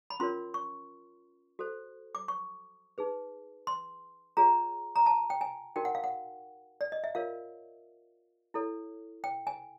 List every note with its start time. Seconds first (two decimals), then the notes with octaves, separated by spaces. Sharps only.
0.10 B5
0.20 C#4 F4 A#4 C#5 C6
0.54 C#6
1.59 F#4 A4 C5
2.15 D6
2.28 C#6
2.98 D#4 G#4 B4
3.67 C6
4.37 F4 G#4 C#5 A#5
4.96 A#5
5.06 A5
5.30 G5
5.41 G#5
5.76 D#4 F#4 A#4 G5
5.85 F#5
5.95 F5
6.04 F#5
6.81 D5
6.92 D#5
7.04 E5
7.15 F4 A#4 C#5 F5
8.54 E4 A4 C#5
9.24 G5
9.47 G#5